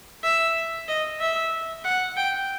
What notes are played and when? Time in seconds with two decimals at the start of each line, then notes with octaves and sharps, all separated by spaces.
0.24 E5
0.88 D#5
1.20 E5
1.84 F#5
2.17 G5